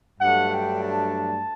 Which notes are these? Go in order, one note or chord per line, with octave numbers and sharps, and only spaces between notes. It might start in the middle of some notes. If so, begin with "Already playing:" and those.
G2 F#3 A3 D4 F#5
G5
A5